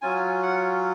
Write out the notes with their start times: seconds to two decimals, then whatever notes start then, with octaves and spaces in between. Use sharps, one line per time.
0.02 F#3 C#4 F4 G#5
0.43 F#5